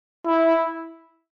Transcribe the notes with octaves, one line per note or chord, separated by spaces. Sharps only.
E4